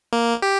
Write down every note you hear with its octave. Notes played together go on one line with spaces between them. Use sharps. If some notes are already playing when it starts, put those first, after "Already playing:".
A#3
G4